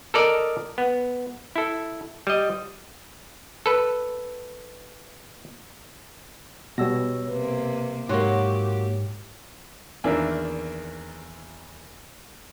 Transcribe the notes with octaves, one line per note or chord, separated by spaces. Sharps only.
A4 A#4 D5 D#5
B3
E4 A4
G3 D#5
A4 B4
B2 G3 C#5 E6 A#6
C3 A#3 B4
G#2 F#3 A#3 G4 C6 C#6
E2 D#3 A#3 D4 E5 F6